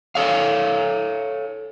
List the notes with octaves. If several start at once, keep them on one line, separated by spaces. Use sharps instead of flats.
A4 C#5 F5